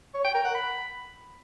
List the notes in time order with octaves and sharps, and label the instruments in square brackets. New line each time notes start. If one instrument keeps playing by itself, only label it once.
[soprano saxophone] C#5
G5
A#4
F#5
B5